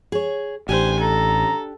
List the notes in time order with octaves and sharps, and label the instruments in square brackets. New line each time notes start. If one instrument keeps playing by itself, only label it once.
[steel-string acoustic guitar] G#4 C#5
[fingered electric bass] A1 [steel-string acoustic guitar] D4 G4 [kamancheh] C5 G#5
[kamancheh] A4 [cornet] A#5